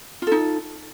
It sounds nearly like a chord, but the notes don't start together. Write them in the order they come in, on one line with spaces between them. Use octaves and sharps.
F4 A4 D#4